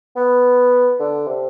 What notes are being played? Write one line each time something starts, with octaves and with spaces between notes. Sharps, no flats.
B3
D3
C3